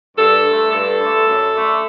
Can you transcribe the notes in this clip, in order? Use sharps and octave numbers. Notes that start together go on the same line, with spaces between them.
G2 A4
D3 A3
G2 A4
D3 A3
F#2
D3 A3